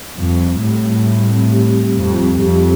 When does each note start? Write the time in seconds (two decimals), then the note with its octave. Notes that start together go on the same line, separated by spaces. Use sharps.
0.17 F2 G3
0.40 C4
0.62 A2 G4
0.84 G3
1.06 G3
1.29 C4
1.51 G4
1.73 G3
1.95 F2 G3
2.18 C4
2.40 F2 G4